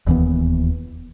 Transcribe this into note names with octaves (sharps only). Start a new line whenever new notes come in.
E1 D#2 E3 B3